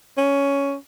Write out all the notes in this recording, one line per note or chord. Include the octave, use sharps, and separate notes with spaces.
C#4